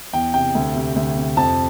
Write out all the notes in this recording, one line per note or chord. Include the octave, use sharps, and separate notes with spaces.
E2 G5
C3 G5
D2
C3
D2
C3
F2 A5